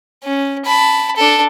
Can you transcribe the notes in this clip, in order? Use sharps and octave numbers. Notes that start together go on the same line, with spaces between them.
C#4
A5 B5
D4 A4